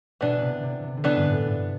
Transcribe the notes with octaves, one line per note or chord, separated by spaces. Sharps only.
B2 E3 B3 D4
C3
C3
C3
D3
C3 E3 B3 D4
G2
A2
G2